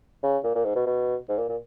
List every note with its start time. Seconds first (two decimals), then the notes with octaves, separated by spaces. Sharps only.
0.23 C#3
0.44 A#2
0.55 A#2
0.65 G#2
0.75 B2
0.86 B2
1.29 G#2
1.38 A#2
1.49 A#2